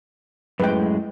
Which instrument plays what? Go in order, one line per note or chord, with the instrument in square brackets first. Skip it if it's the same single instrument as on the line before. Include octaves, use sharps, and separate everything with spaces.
[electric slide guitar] F#2 A2 G#3 [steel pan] B4 G5